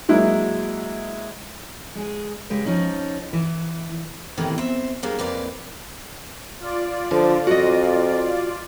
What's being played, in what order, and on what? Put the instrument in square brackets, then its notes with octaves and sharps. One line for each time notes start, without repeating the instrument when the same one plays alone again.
[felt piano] F#3 G#3 A#3 E4
[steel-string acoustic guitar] G#3 G#4
C#3 G#3 G4 B4
F3 C#4 D#4
E3
E2 A2 C3 D#3 E3
C4 E5
F#3 G3 A#3 D4 G#4
F2 A#3 B4 D5
[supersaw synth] F4 D5
[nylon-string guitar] D3 [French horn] F3
[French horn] F2 [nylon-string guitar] F#4 D#5